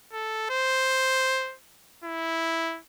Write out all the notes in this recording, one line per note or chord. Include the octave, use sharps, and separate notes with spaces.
A4
C5
E4